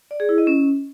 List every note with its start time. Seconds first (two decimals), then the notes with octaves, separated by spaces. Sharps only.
0.11 D5
0.20 G#4
0.29 E4
0.38 D#5
0.47 C#4